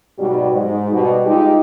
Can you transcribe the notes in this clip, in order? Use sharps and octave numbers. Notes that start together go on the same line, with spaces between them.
G#2 B2 F#3 G3
G#2
B2 G3
G#3 D#4 F4 G4